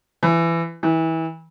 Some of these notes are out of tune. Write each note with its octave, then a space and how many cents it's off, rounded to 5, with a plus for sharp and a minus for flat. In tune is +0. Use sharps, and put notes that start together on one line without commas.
E3 +20
E3 -25